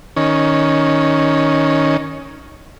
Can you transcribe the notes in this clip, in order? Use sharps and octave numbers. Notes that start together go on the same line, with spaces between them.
D#3 C#4